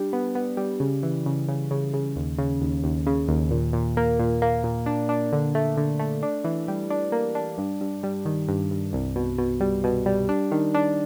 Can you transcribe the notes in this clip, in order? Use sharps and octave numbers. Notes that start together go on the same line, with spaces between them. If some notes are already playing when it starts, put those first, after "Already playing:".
Already playing: G3 D4
B3
B3
G3
C#3
E3
C#3
C#3
C#3
C#3
D#2
C#3
D#2
D#2
C#3
D#2
A#2
A#2
A#3
A#2
A#3
A#2
D4
D4
D3
A3
D3
A3
D4
E3
G3
D4
A#3
D4
G2
G2
G3
D#3
G2
G2
C2
B2
B2
G3
B2
G3
D4
D#3
D4